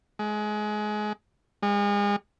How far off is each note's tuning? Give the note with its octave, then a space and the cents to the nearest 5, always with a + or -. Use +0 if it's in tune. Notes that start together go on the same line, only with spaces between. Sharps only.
G#3 +25
G#3 -35